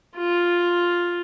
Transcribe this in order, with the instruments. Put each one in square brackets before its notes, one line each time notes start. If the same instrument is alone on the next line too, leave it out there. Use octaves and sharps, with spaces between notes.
[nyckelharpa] F4